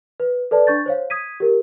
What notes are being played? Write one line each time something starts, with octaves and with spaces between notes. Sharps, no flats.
B4
A4 B4 D5 A5
D4 C#6 G6 A6
C5 C#5 F5
D#6 G#6 B6 D#7
G4 A#4